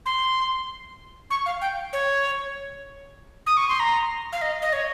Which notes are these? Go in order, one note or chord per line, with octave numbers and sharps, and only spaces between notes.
C6
C#6
F5
G5
C#5
D#6
C#6
C6
A#5
F5
D#5
D#5
C#5